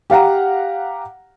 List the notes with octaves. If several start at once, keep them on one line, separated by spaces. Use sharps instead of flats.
G4 F5 F#5 A#5